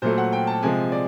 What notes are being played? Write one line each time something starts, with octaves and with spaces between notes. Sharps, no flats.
A#2 F#3 A3 C5
F#5
G5
A5
C3 F3 G#3 G#5
D5